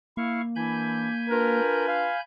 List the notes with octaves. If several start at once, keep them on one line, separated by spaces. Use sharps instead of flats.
A#3 E4 F5 C#6
E3 D4 E4 G#5 B5 G6
D4 F4 A#4 B4
F5